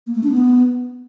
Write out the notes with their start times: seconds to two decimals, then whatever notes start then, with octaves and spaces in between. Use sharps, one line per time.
0.07 A#3
0.15 A3
0.23 D4
0.32 B3